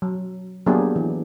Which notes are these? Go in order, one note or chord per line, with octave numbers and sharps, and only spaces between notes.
F#3
F#3 A#3 B3 D4 G4 G#4
E3